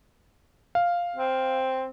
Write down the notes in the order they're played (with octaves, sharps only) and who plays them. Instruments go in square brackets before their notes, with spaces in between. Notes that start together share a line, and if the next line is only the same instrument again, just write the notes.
[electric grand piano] F5
[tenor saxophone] C4